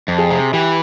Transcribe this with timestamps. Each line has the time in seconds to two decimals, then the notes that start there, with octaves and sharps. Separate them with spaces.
0.08 F2
0.18 G#4
0.30 C3
0.53 E3 G4